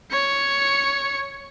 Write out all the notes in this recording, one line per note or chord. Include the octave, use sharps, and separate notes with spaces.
C#5 C#7